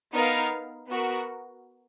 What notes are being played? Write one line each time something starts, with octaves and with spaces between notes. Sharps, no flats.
B3 D#4 A#4 F5
B3 F#4 A#4